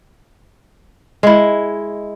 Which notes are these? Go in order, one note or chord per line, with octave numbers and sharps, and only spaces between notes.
G#3 E4